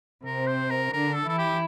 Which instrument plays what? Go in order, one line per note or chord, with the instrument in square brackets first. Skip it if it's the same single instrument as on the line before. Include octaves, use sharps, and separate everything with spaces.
[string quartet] C3 C4 [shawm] A#4
[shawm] C5
A#4
[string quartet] D3 D4 [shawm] A#4
[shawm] A4
[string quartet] E3 E4 [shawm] A4
[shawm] G4